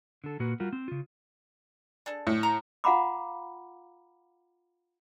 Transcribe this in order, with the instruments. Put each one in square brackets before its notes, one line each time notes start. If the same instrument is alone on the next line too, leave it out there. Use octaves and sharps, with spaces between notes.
[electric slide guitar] D3 A4
A#2 A#3 F#4 B4
G3 F4 F#4 A#4
C4
C#3 F4
[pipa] D4 G#4 A4
[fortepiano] A2
[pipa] A#5
[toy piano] F4 F5 F#5 A#5 B5 D6